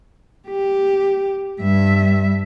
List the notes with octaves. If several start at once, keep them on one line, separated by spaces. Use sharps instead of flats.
G4
G2 E5